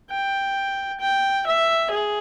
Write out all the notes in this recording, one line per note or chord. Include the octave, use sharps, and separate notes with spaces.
G5
G5
E5
G#4